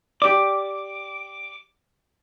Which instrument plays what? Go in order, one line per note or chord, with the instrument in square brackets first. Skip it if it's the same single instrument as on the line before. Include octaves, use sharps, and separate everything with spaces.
[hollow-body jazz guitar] G4 D5 [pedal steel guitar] D6